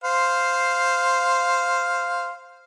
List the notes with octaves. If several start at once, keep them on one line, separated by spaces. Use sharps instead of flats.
C5 F5